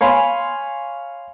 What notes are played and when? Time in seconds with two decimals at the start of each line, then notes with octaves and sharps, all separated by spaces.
0.01 C#5 F5 G#5 B5 C6